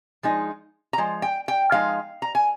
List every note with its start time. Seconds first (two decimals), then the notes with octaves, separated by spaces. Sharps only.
0.23 F3 G#3 D#4
0.93 A#5
0.98 F3 G#3
1.22 G5
1.48 G5
1.72 F3 G#3 D#4 F5
2.22 A#5
2.35 G#5